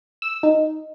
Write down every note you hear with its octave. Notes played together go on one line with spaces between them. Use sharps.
E6
D#4